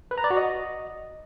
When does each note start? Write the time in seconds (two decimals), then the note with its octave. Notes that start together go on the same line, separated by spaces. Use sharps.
0.11 B4
0.18 A#5
0.24 D5
0.30 F#4
0.37 D#5